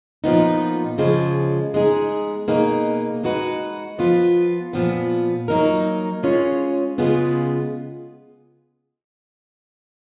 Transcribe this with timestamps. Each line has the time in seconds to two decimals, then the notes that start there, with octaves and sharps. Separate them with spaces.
0.24 A#2 F3 B3 D#4
0.98 C#3 F3 G#3
1.74 G#3 B3 D#4 G#4
2.48 B2 A#3 D#4 G#4 B4
3.23 G#3 D#4 F#4 B4
3.98 F3 B3 F4 B4
4.73 A#2 F3 B3
5.48 F#3 A#3 D#4 A#4
6.23 G#3 C#4 F4 G#4 C#5
6.98 C#3 G#3 B3 F4 G#4